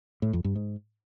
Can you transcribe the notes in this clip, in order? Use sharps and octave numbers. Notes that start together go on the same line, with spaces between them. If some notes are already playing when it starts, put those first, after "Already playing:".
A2
F2
G2
G#2